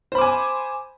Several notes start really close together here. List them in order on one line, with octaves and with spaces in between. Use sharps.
C5 B5 D6 G#5